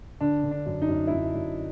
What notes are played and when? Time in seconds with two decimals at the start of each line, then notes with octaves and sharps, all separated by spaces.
0.21 D3 D4
0.44 D3
0.51 D4
0.66 F#2
0.82 D#4
0.89 F#2
1.07 E4
1.12 F#2 D#4
1.35 F#2